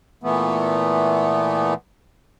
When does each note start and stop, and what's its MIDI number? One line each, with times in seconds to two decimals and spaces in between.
0.23 1.74 46
0.23 1.74 52
0.23 1.74 57
0.23 1.74 59